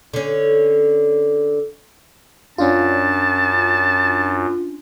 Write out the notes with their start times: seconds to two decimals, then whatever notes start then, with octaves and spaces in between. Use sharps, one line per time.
0.14 D3 C#4
2.58 F#2 C#4 D4 F4 A5